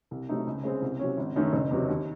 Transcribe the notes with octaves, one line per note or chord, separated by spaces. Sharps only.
C2
C3 F#3 A3 D#4
C#2
C#3 G#3 C4
C2
C3 F#3 C#4
G#1
F#2 D#3 A3
F#1
E2 C3 F#3
D#2